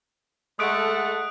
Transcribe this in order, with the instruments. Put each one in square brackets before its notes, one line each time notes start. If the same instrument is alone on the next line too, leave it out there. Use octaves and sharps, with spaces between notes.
[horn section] G#3 A3 [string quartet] A4 F#5 [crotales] D#6 F#6 D7